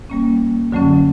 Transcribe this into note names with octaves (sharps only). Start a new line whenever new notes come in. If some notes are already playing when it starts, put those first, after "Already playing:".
G3 A#3 C#4
F#2 D3 F#3 A3 C#4